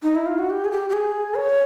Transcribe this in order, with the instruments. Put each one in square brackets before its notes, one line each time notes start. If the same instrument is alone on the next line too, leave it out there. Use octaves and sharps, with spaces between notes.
[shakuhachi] D#4
E4
F4
F#4
G4
G#4
G4
G4
G#4
C#5